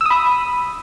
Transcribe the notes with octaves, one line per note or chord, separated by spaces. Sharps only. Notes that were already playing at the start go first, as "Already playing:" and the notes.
B5 D#6 E6